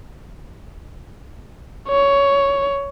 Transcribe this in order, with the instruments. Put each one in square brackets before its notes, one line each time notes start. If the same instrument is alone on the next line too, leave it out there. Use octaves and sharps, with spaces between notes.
[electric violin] C#5